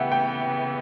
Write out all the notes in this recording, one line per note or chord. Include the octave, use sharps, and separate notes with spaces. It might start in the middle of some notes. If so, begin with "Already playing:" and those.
Already playing: C#3 E3 B3 E5 F#5 G5
G5